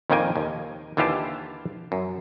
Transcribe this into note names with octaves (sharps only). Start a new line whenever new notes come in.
F2 A#2 D#3 A#3 G5 G#5
D#2
D#2 D3 E3 F4 G4 A5
F#2